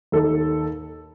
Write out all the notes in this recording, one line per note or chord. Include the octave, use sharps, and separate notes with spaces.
D#2 D#3 A4